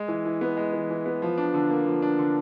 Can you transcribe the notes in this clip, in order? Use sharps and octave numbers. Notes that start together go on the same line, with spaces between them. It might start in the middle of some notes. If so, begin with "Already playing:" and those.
Already playing: G#3
E3
E3
B3
G#3
E3
E3
B3
F3
D4
D3
A#3
F3
D4
D3